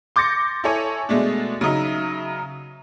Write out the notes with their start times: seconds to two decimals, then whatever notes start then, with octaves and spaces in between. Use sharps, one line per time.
0.16 C6 D6 G6 A6 A#6 C#7
0.64 E4 A4 C#5 G#5
1.09 B2 G#3 A3 D4
1.61 C#3 F#3 D#4 E5